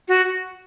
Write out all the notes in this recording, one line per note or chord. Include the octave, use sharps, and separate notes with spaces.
F#4